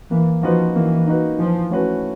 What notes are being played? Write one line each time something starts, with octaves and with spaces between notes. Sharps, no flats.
E3 A#3
F3 D#4 F#4 B4
E3 A#3
D#4 F#4 B4
E3 F3
A3 C#4 F#4 B4